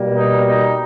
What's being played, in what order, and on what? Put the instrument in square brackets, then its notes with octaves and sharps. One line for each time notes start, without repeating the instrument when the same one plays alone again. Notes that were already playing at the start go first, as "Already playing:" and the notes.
Already playing: [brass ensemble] B2 G3 A#3
D#4
D#4